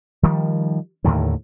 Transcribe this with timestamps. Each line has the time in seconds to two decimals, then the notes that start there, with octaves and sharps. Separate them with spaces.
0.23 D#3 F3 G3
1.04 D#2 A2 D3 D#3